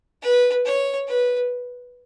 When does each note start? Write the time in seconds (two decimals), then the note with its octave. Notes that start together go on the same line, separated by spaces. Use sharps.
0.22 B4
0.65 C#5
1.07 B4